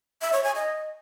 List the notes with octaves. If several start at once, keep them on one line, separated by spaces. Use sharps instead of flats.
E5
C#5
G#5
D#5